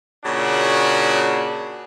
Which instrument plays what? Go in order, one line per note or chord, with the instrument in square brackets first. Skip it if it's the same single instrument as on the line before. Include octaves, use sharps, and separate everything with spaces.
[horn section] A#2 C#3 D4 F#4